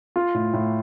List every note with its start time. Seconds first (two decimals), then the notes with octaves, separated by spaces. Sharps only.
0.16 F4
0.34 A2
0.53 A2